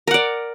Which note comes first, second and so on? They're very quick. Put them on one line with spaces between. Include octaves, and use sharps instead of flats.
A#4 F#5 D5